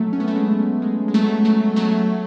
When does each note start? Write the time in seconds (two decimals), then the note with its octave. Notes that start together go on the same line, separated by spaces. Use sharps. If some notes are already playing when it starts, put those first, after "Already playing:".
Already playing: F#3 A3
0.13 C#4
0.20 B3
0.28 A3
0.36 G#3
0.82 G#3
1.08 G#3
1.14 F#3 A3
1.45 F#3 A3
1.76 F#3 A3